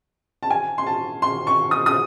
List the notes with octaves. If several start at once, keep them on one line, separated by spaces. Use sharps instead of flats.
A5
G#5
C6
A5
C6
C#6
D#6
D#6